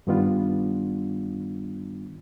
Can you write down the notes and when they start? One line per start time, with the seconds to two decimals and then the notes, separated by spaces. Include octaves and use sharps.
0.07 G2 D#3 G3 B3 D4 F4